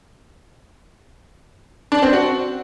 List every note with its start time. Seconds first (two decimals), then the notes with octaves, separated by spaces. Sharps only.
1.92 D4
2.02 C4
2.13 F#4